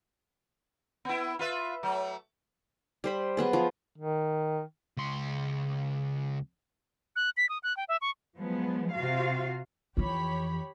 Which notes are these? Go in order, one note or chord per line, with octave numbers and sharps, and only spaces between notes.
B3 E4
F4 B4 E5
F#3 A3
G3 C5 B5
F#3 B3 G#4
F3
D#3
C#2 C6
F#6
B6
D#6
F#6
G5
E5
C#6
F3 F#3 G#3 B3
C3 F4 F#4 F5
F2 E3 G4 C#5 B5